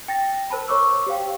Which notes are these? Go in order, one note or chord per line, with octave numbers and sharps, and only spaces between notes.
G5 A6 A#6
A#4 C5 A5 B5
A#4 C#5 C#6 D6 E6
G4 C5 F5 G5